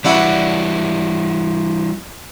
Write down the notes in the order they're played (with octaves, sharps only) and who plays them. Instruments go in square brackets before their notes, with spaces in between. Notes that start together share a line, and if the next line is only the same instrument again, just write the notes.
[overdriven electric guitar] E3 G3 [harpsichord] D4 E4 F#4